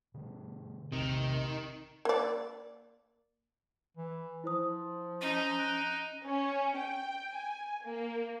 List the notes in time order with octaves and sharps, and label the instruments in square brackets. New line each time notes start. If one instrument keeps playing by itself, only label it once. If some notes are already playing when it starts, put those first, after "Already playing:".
[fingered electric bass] B2 D3 A3
[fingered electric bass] A#1 E2 [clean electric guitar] C3 [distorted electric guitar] D#3
[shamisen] A#3 D5
[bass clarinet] E3
[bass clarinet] F3 [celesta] E4 C5 D#6
[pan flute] C#4 [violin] D#4
[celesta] F#6 A#6 D7
[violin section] C#4
G5
G#5
A#3